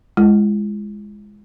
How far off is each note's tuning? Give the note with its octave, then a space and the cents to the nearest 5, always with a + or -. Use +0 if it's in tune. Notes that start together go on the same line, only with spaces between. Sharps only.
G#3 +0 E4 +45